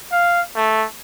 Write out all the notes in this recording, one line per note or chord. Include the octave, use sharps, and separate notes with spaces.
F5
A3